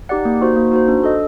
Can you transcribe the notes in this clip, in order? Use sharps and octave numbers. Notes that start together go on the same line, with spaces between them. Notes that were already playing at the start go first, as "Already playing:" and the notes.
D#4 G4 D5 F#5
A#3
D#4 F#4 C5
A#3
D#4 F#4 C5
D4
A4 D#5